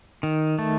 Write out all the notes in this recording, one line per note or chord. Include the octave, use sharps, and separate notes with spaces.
D#3
A3